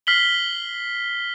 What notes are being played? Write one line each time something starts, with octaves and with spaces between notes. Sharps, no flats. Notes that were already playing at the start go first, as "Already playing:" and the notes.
F6 B6 C7 F#7 G7